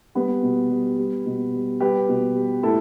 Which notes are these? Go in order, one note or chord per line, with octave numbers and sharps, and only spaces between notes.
G3 B3
B2
G3
G3
B2
G3
G3 G4 B4
B2
G3
A2 E4 A4